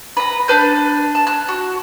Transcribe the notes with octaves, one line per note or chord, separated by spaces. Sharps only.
B4 A#5
D4 B4 G6
A5
F#6
F#4